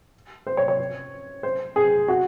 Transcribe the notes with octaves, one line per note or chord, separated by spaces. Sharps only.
C5
C#5
C#5
C5
G#4
F#4